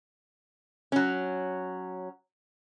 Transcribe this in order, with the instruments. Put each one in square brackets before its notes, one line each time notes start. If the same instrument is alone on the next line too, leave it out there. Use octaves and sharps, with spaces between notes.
[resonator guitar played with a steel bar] F#3 C#4